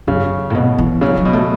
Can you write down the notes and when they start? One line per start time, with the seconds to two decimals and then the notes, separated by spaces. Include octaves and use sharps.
0.07 F#2 C#3
0.50 A2
0.54 B2
0.78 E3
1.01 C#3 F#3
1.17 F#3
1.25 B2
1.33 A3